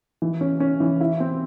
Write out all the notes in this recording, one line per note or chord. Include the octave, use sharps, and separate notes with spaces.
E3
C#4
C#4
E3
E4
C4